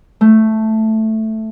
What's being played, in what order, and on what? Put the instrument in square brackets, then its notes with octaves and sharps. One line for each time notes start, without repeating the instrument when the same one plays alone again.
[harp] A3